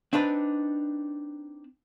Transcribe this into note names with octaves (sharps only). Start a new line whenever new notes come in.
C4 D4 D#4 B4 D5